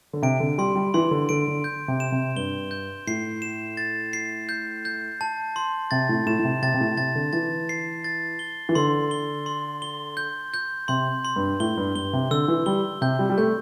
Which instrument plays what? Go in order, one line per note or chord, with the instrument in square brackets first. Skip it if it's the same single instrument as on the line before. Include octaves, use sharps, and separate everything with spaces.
[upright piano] D3
[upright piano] C3 [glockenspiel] D7
[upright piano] D3
[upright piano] G3 [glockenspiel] C6
[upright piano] G3
[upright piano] E3 [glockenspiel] C6
[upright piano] D3
[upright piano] D3 [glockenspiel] D7
[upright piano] D3
[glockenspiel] G6
[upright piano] C3
[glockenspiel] E7
[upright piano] C3
[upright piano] G2 [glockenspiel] G7
[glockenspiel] G6
[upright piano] A2 [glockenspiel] C7
[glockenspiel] E7
A6
C7
G6
G6
A5
C6
[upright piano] C3 [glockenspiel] A6
[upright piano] A2
[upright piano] A2 [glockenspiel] E7
[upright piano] A2
C3
[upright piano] C3 [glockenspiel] A6
[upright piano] C3
A2
[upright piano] C3 [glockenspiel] A6
[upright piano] D3
[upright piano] E3 [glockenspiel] A6
[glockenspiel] C7
A6
G7
[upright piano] E3
[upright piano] D3 [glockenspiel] C6
[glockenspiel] G7
C6
G7
G6
G6
[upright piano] C3 [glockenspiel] C6
[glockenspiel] C6
[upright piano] G2
[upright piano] A2 [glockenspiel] G7
[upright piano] G2
[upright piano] G2 [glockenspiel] G7
[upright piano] C3
[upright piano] D3 [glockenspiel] E6
[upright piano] E3
[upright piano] G3 [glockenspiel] G7
[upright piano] C3 [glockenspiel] G6
[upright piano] G3
G3
[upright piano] A3 [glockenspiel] G6